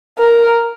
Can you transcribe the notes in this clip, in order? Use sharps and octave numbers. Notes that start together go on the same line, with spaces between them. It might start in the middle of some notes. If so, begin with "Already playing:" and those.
A#4